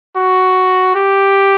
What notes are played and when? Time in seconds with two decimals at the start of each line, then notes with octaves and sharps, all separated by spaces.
0.16 F#4
0.95 G4